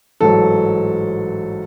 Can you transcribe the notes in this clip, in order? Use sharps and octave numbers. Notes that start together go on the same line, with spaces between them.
A1 G#2 F#3 A4